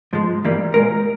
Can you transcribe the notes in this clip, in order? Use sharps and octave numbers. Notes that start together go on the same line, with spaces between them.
G#2 F3 G#3
G2 E3 G3 A#3
A#2 G#3 A#4